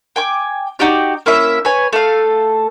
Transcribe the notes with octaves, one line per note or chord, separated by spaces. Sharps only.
G5 G#5 D6
D#4 F#4 G4 D5
A#3 C#4 E4 E5
B4 C#5 G#5
A3 A4 F5